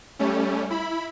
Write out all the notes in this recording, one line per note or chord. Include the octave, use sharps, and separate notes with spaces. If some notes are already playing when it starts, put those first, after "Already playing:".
G3 A3 C#4
E4 B5